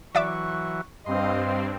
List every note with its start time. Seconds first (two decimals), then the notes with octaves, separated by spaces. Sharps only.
0.15 E3 F#3 D5 E5 C#6 D6
1.06 G2 C4 D#5 F5 C6